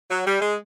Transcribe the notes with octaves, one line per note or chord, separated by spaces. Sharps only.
F#3
G3
G#3